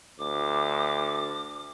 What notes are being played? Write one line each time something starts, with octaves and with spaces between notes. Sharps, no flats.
D2 D6